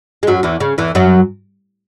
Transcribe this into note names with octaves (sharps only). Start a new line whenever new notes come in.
G#3
F#2 F#3
E2 E3
C#3
E2 E3
F#2 F#3